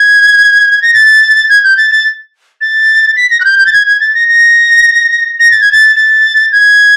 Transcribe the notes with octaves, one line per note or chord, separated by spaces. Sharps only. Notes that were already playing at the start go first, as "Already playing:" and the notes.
Already playing: G#6
A#6
A6
G#6
G6
A6
A6
A6
B6
A#6
F#6
G6
G6
A6
G#6
G#6
A6
A#6
A#6
A#6
A6
G#6
A6
A6
G#6